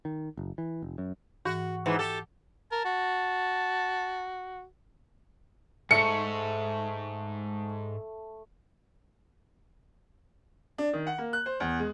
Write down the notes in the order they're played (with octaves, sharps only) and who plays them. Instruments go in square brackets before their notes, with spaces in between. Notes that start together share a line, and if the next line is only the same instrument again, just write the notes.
[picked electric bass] D#3
F#1
E3
F1
F#2
[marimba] G#2 E3 [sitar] F#4
[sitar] G#2 E3 [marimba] F#5
[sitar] G4 A4
[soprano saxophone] A#4 [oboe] A5
[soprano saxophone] F#4
[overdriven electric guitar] G#2 [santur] A3 C#6 [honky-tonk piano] C#7
[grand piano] D4
D#3
F#5
A#3
F#6
C5
E2
G#3